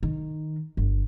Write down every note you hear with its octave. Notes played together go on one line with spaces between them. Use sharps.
D#3
G1